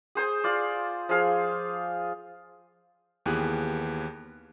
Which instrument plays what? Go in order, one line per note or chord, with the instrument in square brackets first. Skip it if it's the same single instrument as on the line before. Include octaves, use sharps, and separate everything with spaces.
[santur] G#4 C5 G#5
F4 D5
F3 G#4 F5
[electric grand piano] D#2 E3 B3 G4 G#4 F#6